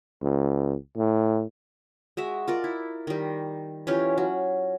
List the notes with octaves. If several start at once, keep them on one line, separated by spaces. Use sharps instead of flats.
C#2
A2
G#3 F#4 E5
F4 A#4 D5
E4
D#3 G3
E3 C#4 F4 G4
F#3